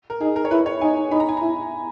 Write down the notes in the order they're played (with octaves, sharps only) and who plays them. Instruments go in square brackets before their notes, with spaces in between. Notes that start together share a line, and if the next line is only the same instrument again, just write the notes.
[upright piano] A#4
[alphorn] D#4 [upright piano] G#4
[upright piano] A#4
C#5
[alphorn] E4 [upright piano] B4
[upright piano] C#5
[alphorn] D#4 [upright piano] G#5
[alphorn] D#4 [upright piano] B5
[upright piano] A#5
G#5
[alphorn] E4 [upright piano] A#5